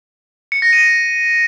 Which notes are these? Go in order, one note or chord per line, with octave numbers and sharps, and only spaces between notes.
C#7
A#6
D#7